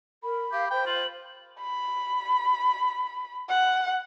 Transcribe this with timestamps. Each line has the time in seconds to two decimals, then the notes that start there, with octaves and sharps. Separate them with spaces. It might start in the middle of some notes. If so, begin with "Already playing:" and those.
0.23 A#4 B5
0.53 G4 F5
0.71 C5 G5
0.86 F4 F#7
1.60 B5
3.49 F#5